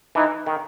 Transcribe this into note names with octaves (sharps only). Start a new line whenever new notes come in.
E3 D#4
D#3